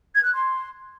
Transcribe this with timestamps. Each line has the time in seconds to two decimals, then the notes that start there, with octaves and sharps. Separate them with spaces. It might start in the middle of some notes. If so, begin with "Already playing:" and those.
0.14 G#6
0.24 F#6
0.34 C6